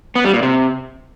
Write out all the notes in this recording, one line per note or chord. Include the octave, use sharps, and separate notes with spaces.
B3
G3
A#2
C3